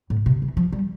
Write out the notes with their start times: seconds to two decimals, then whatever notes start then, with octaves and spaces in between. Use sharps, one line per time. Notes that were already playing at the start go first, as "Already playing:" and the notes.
0.10 A2
0.26 C3
0.42 E3
0.57 F3
0.72 G3